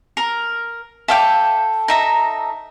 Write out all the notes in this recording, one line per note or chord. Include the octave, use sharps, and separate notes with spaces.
A#4
A4 E5 F5 G5 D6
D#4 E5 A#5